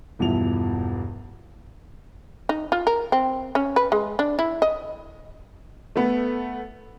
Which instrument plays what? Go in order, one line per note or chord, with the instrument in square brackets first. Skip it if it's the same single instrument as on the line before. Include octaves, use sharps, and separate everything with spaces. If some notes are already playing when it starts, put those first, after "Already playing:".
[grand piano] E1 E2 G2 F3 E4 F7
[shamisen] D#4
F4
A#4
C4
C#4
B4
G#3
D4
E4
D#5
[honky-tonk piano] A3 B3